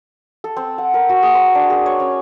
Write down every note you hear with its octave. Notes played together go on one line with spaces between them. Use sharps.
A4
C4
F#5
A#4
F#4
G#4
C5
D4
G#4
C#5
C#4